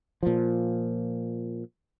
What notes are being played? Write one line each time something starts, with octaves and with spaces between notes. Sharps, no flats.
A#2 F3